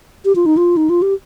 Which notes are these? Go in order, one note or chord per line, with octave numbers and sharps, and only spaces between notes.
G4
F4
D#4
F4
D#4
F4
G4